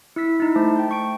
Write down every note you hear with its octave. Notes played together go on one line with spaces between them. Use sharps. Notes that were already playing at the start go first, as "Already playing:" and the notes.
E4 E6 B6
D#4 E4
A3 C5 A5
G5 G6
A3 C#6 D7